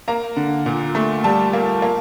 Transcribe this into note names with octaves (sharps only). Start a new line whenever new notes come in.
A#3 A#5
D3
A#2
A3
G3 A5
A#3
A#3